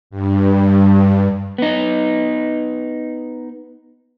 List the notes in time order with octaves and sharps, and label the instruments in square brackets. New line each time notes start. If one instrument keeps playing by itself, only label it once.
[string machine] G2
[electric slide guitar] B3 D#4